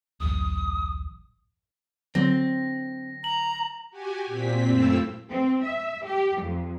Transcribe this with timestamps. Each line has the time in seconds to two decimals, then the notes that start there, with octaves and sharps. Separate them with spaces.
0.20 D1 A1 F#2 D#6
2.15 D3 F#3 C4 A#6
3.24 A#5 F#7
3.90 F#4 G4 G#5
4.26 A#2 C4 B6
4.67 F#2 A3 C4 E4 F4 E6
5.31 C4
5.64 E5
6.06 G4
6.43 F2